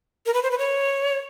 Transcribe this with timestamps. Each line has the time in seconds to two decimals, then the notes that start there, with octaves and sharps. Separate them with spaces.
0.26 A#4
0.34 B4
0.43 C5
0.51 B4
0.58 C#5